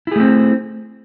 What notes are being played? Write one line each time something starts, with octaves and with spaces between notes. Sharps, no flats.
A3 C4 E4 G#4